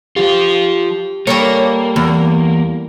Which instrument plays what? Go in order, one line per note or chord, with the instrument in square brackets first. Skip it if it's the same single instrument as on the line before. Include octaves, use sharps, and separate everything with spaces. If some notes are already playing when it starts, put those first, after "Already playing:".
[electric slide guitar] F3 F4 [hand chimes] G4
[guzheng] G3 A4 A#4 [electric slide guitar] A#3 [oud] C#5
[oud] E2